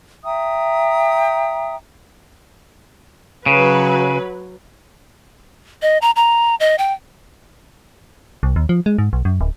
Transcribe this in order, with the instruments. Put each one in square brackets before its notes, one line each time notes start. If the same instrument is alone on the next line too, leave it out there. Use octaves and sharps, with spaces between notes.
[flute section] E5 G5 A#5 D#6
[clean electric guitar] C#3 [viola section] F#3 B4
[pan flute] D#5
A#5
A#5
D#5
G5
[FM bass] C2
D#2
F3
G#3
G#2
B1
F#2
D1